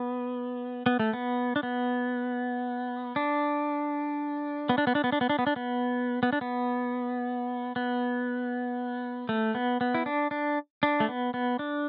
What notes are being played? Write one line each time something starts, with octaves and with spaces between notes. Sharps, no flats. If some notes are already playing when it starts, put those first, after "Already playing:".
Already playing: B3
B3
A3
B3
D4
B3
D4
B3
D4
B3
D4
B3
D4
B3
D4
B3
D4
B3
B3
D4
B3
B3
A3
B3
B3
E4
D4
D4
D4
A3
B3
B3
D4